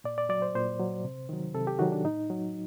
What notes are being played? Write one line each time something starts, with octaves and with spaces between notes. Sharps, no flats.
A#2 D5
D5
F#3 D5
C5
A#2 C5
F#3
C3
D#3 F#3
C3 A4
G4
D#3 F#3 F#4
D4
A2 D#4
F#3